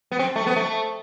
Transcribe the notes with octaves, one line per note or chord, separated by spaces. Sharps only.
B3
C4
A3
B3
A3